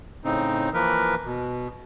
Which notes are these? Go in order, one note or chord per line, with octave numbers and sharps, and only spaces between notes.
A2 C#3 C4 D#4
E3 F3 A#3 A#4 B4
B2